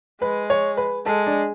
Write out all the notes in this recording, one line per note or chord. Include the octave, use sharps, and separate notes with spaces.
G#3 B4
C#5
B4
G#3 A4
D4